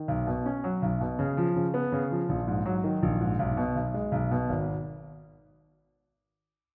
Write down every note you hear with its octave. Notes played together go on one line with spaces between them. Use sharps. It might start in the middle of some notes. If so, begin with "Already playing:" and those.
Already playing: D#3
B1
B2
C#4
F#3
B1
B2
C#3
F3
C#3
B3
C#3
F3
A#1
G#2
F#3
D#3
A#1
G#2
B1
B2
B1
G#3
B1
B2
G#1